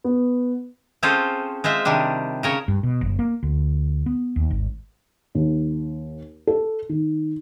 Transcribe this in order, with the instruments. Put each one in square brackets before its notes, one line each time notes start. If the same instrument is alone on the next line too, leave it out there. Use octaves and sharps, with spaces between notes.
[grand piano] B3
[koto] C4 C#4 F4 G#4 A4 C5
G#3 F4 C5 E5
C3 D#3 G3 D4
C#3 A#4 C#5
[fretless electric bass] G2
B2
F#1
A#3
D2
B3
D#2
G#1
[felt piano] D#2
A4
D#3